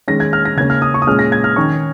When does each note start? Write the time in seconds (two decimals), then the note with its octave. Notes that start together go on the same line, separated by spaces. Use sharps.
0.08 D#3 G#3 C#4 A#6
0.20 G#6
0.33 F6
0.45 A#6
0.57 C#3 A#3 C#4 G#6
0.70 F6
0.82 D#6
0.94 C#6
1.02 D#6
1.07 A#2 G#3 C#4 F6
1.19 A#6
1.32 G#6
1.44 F6
1.56 D#3 C#4 C#6